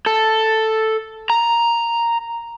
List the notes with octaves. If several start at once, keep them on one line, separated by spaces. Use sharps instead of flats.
A4
A#5